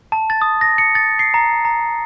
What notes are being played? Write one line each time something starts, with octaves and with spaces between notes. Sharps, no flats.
A5
A6
D#6
A#6
C#7
A6
C7
A#5
A#5